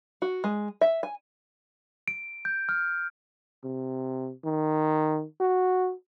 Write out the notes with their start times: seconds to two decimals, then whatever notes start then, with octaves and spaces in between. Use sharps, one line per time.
0.22 F#4
0.44 G#3
0.81 E5
1.03 G#5
2.08 D7
2.45 G6
2.69 F6
3.64 C3
4.45 D#3
5.41 F#4